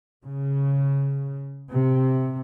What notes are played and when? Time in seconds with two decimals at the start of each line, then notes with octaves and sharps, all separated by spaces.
0.25 C#3
1.72 C3